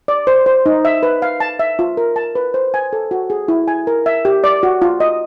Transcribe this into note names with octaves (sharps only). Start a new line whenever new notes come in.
D5
C5
C5
D#4
E5
B4
F5
A5
E5
F4
A#4
A5
B4
C5
G#5
A4
F#4
G#4
E4
G#5
A#4
E5
G4
D5
F#4
F4
D#5